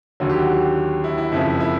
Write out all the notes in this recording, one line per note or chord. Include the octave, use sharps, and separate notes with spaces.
D#2 D3 F#3
G4
F#4
E4
E4
F#1 F2 C#3 E4
E4